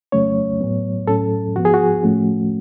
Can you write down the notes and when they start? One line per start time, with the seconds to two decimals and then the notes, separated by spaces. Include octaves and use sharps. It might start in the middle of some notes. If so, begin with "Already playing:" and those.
0.12 F2 C#3 F#3 A3 C#4 C#5
0.61 A2 F#3 B3
1.07 A2 F#3 C#4 A4
1.56 G#2 F3 B3 F#4
1.65 G#4
1.74 F#4
2.03 A2 F3 A3 C#4